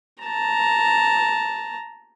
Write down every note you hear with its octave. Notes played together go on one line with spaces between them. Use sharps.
A5 A#5